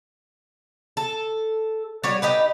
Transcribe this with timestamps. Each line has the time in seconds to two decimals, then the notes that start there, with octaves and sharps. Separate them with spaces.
0.97 A4
2.04 G3 F#4 C#5
2.22 D#4 G4 B4